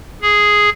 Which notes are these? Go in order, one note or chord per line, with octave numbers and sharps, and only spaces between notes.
G#4